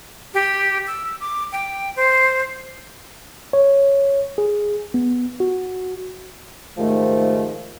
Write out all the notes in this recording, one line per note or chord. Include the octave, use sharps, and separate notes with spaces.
G4
E6
D6
G5
C5
C#5
G#4
B3
F#4
D#2 G#2 D#3 F3 A3